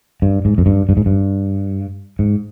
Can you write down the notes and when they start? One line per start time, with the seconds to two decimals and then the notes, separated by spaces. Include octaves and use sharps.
0.22 G2
0.45 G#2
0.58 F2
0.66 G2
0.89 G2
0.97 G#2
1.06 G2
2.19 G#2